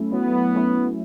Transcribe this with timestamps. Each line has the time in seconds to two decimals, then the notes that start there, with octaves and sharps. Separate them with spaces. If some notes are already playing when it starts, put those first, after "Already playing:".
Already playing: F#3 A3 C#4 E4
0.13 F#3 B3
0.55 A3 C#4 E4